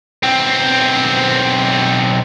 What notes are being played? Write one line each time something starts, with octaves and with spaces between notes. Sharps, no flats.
B1 C4